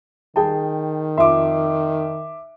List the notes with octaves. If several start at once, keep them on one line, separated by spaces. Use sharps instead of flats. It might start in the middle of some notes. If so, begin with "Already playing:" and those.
D#3 G#4 G5 A5
F2 E5 C6 D6